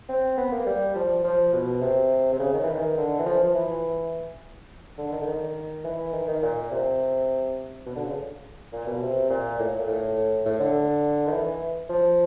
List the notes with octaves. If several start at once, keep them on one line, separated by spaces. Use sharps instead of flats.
C4
B3
A#3
G3
F3
F3
B2
C3
C3
C#3
D#3
E3
D#3
D3
E3
F3
F3
E3
D3
D#3
D3
D#3
E3
D#3
D#3
A#2
C3
B2
D3
C#3
A#2
B2
C3
A#2
A2
A#2
A2
A2
D3
D#3
E3
F3